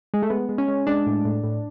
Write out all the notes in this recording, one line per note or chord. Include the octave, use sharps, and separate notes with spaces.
G#3
A3
G#3 B3
G#3
C#4
G#3
G#3 D4
A2
A2
A2